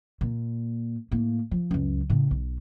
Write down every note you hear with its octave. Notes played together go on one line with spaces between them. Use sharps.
A#2
A2 A#3
F3
C#2 F#2
A2 C#3
B1